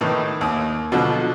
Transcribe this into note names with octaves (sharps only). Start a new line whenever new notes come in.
A2 D#3 E3
D#2 D#6
B2 D3 F3 F#3